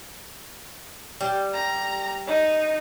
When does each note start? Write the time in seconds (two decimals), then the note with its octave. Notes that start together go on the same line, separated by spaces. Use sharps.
1.21 G3
1.54 A#5
2.27 D#4